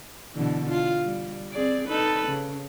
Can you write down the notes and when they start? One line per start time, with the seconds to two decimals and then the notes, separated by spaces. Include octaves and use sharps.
0.34 B2 D3 E3
0.69 F4
1.04 G3
1.51 C4 G#4 D5
1.88 D#4 A4 B4
2.28 C#3